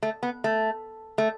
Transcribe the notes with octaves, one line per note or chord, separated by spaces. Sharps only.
A3
B3
A3
A3